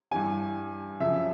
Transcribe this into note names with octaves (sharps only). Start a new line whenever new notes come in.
G2 E3 G3 G#5
F#2 C#3 F3 E5